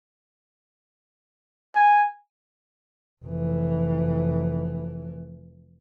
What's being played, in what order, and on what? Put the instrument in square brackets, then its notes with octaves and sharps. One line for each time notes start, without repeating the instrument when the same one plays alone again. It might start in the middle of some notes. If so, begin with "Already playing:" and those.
[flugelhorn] G#5
[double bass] F1 E3